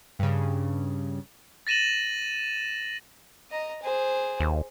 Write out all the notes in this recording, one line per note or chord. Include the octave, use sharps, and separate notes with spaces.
G2 C#3
A6 A#6 D#7 E7 F#7
D#5 A#5
G#4 C5
D#2